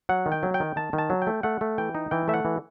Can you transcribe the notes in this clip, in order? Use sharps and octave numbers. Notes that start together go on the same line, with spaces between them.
F#3 F#5
D#3
G5
F#3
G5
D#3
D#3 A5
D#3
A5
F#3
G5
A3
A3 F#5
A3
E3 G5
D#4
E3 G5
A3 E5
F#5
E3